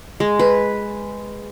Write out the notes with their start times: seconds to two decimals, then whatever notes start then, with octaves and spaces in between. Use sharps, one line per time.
0.20 G#3
0.39 B4